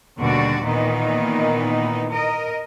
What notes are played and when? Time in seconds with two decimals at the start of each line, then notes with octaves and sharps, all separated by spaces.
0.19 D#2 B2 D3 G3 F#4 D5
0.64 A#2 D#3 E3 B3 D#4
2.12 A#4 D#5